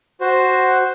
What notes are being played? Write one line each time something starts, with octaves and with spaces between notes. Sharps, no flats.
F#4 C5